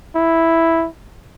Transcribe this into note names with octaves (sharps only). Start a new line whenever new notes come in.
E4